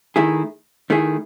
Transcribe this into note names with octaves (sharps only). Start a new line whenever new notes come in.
D#3 A3 E4 G#4
D#3 A3 E4 G#4